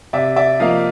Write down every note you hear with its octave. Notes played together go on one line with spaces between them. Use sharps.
C3 D5 E5
D5 E5
F3 A#3 D#5 F5